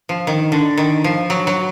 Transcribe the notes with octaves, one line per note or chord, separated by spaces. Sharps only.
F3
D#3
D3
D#3
F3
F#3
F#3